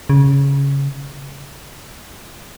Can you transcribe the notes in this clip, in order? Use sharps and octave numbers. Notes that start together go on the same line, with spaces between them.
C#3